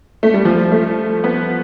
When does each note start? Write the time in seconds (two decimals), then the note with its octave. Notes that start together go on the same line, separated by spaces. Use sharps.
0.23 A3
0.34 G3
0.45 F3
0.72 A3
1.24 B3